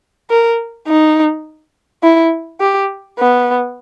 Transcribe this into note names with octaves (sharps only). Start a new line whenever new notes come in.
A#4
D#4
E4
G4
B3